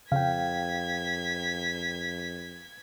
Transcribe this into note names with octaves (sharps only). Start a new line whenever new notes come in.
F2 C#3 F5 G5 G#6 B6